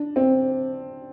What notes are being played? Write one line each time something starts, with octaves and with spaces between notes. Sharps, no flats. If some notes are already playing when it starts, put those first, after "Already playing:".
Already playing: D4
C4